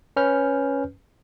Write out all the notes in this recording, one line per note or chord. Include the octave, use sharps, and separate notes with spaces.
C#4 B4 F6 G6